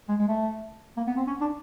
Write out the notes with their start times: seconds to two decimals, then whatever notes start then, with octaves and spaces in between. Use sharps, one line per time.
0.09 G#3
0.19 G#3
0.28 A3
0.97 A#3
1.07 B3
1.17 C4
1.27 C#4
1.41 D4